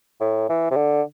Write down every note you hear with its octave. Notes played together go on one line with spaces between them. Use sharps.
A2
E3
C3
D3